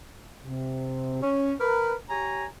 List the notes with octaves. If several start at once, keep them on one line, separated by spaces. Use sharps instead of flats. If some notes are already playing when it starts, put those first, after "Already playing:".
C3
C#4
A#4 B4
G4 C#5 G#5 A#5